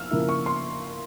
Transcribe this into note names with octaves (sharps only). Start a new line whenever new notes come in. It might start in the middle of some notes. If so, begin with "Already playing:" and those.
Already playing: F3 A#3 E6 F6
C#3 F3 A#3 E4
C#6
C6